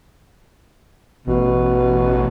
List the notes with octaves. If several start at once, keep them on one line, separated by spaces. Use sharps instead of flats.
A1 B2